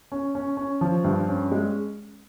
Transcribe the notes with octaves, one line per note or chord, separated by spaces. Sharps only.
C#4
C#4
C#4
F3
G2
C#4
G#3